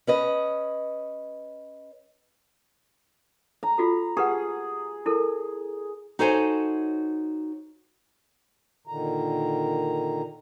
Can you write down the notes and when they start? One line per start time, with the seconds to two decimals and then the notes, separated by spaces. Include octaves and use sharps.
0.07 C#4 B4 D#5
3.63 A#5
3.78 F4 F#4 A4
4.17 G4 G#4 B4 F#5
5.06 E4 A4 A#4
6.19 D#4 F#4 A4 C5 C#5 G#5
8.87 A#2 D3 D#3 A#5